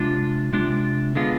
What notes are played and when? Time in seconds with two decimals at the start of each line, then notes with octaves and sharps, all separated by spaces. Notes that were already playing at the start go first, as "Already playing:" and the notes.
Already playing: C3 G#3 D4 F4
0.53 C3 G#3 D4 F4
1.15 D3 G#3 B3 F4